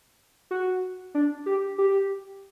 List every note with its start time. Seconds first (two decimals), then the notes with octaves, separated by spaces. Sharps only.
0.51 F#4
1.15 D4
1.46 G4
1.78 G4